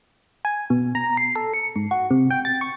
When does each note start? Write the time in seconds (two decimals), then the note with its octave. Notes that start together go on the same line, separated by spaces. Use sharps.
0.45 G#5
0.70 B2
0.95 A#5
1.17 C7
1.36 A4
1.54 C#7
1.76 G#2
1.91 F#4
2.11 C3
2.31 G5
2.45 A6
2.61 C#6